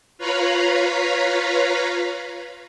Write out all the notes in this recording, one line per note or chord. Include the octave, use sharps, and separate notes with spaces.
F4 B4 C#5 F5 A#5 B5